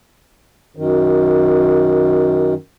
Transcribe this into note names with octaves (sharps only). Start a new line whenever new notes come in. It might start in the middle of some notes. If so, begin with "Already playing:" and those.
F#2 D#3